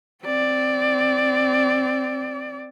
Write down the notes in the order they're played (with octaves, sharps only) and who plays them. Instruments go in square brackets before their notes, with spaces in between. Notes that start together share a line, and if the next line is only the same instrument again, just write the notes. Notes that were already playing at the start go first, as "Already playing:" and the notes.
[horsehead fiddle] C4 D5